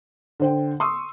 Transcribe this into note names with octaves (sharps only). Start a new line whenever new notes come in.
D3 C5 G5
C6 C#6 D#6 E6